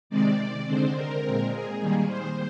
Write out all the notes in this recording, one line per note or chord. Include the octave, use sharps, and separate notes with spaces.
C3 D#3 G#3 C4 D5
D3 G#3 C4 C5
A#4
A#2 G#3 C4
G#4
D#3 G3 A#3
C5